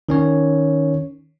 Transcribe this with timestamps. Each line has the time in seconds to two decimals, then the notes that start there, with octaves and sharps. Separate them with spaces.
0.09 D#3 C#4 C#5